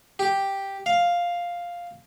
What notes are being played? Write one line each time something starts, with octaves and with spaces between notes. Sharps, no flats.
G4
F5